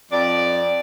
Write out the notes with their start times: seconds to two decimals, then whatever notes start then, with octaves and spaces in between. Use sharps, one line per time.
0.12 F2 D5